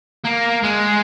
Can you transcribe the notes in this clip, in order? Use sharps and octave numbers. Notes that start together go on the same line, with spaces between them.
A#3
G#3